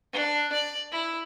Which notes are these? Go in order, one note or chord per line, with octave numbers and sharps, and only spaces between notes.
D4
D5
E4